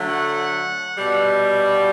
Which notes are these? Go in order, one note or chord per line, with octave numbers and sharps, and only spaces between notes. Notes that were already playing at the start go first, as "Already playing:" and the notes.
Already playing: D3 F#3 A3
F#5
B2 G3